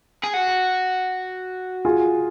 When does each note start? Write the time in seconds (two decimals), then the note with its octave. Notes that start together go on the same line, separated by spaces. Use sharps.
0.23 G#4
0.33 F#4
1.85 F4 G#4